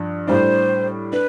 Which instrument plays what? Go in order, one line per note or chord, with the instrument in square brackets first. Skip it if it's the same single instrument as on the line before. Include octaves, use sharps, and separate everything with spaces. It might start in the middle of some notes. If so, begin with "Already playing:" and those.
Already playing: [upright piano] G2 F3
[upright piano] A2 G3 D4 [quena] C5
[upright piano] D4 [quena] B4